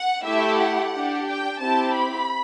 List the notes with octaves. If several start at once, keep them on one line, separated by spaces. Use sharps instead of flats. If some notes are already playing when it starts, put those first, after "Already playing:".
Already playing: F#5
A3 E4 G4 E5
F#5
D4 G4
G5
C4 E4 G4 A5
B5